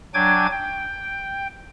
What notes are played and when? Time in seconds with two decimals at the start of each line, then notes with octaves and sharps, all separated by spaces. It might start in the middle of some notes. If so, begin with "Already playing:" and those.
0.14 F#3 D4 G5 G#5 D6 G#6
0.52 G5